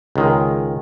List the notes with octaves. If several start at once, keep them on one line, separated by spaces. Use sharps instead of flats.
C#2 D#3 G#3